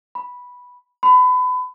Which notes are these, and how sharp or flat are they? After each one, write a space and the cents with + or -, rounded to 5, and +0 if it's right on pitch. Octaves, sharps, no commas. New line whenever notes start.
B5 -5
B5 +30